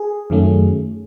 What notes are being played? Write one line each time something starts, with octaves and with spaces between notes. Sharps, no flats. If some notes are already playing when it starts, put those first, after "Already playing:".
Already playing: G#4
F#2 D#3 F#3 A3 C#4